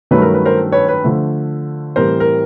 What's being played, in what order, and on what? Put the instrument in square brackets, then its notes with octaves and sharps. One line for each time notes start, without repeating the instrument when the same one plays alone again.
[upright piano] G2 D#3 F#3 A3 C#4 B4
A#4
B4
A#4 C5
B4 C#5
B4
D3 F3 A3
A2 E3 G3 C4 A#4 C5
A#4